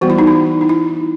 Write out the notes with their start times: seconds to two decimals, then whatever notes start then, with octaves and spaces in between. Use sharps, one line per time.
0.01 E3 G3 B3 F#4
0.10 E4
0.18 D#4
0.27 E4
0.61 D#4
0.69 E4